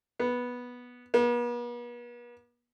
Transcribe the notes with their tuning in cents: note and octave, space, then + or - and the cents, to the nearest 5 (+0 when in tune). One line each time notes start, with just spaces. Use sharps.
B3 -10
B3 -45